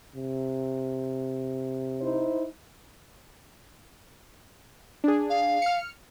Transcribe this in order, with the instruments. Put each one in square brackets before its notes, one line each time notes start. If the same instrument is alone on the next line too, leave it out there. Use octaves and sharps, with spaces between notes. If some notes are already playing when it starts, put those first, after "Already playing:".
[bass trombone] C3
[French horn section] D#4 E4 C5
[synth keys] D4 G#4
[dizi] F5
[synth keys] F6 C#7